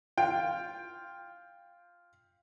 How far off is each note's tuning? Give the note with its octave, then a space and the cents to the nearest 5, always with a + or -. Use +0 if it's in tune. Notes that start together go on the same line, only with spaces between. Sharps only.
F4 +0 G5 +15